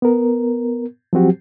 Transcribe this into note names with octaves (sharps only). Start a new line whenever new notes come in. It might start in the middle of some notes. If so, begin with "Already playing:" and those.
B3 A#4
F3 F#3 C4 F#4 G4